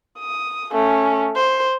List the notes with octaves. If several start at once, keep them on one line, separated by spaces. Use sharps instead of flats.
D#6
A3 C#4
C5